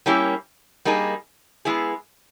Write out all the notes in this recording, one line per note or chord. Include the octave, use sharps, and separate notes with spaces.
G3 A#3 C#4 E4 G4
G3 A#3 D#4 G#4
G#3 B3 E4 G#4